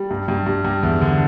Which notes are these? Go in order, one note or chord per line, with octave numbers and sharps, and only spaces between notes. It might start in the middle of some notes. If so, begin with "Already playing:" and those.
Already playing: G3
G2
G2
G2
G2
E2
D3